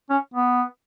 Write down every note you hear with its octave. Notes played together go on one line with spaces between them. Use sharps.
C#4
B3